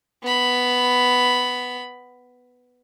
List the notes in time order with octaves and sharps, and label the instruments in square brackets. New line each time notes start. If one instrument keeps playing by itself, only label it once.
[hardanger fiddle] B3 B5